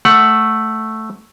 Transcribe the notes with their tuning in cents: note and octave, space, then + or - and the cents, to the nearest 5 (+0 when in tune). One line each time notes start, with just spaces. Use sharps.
A3 +0 F#5 +0